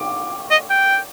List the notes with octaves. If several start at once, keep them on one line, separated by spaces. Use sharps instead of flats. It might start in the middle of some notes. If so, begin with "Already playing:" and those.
Already playing: D6
D#5
G5